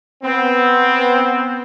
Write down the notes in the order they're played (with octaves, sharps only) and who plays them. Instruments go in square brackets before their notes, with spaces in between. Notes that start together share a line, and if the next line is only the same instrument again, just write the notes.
[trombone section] B3 C4